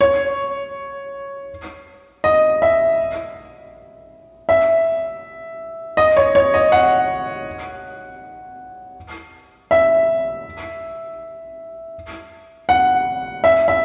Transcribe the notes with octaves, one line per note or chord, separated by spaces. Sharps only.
C#5
D#5
E5
E5
D#5
C#5
C#5
D#5
F#5
E5
F#5
E5
E5